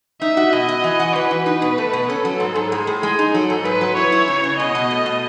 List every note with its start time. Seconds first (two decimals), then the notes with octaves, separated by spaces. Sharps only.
0.22 D#4 E5
0.37 F#4
0.53 B2 D#5
0.69 F#4
0.84 E3
1.00 F#4
1.15 E3 B4
1.31 F#4
1.46 D#4 B4
1.62 B2
1.78 A3
1.93 B2
2.09 C#4 A4
2.25 F#3
2.40 G#2
2.55 G#2
2.72 A2 G#4
2.87 A2
3.03 G#3
3.19 D#4
3.34 F#3 A4
3.50 G#2
3.65 G#2 B4
3.81 F#3
3.96 E4 C#5
4.12 E4
4.28 C#3
4.44 C#3
4.59 B2 D#5
4.75 B2
4.91 A3
5.06 B2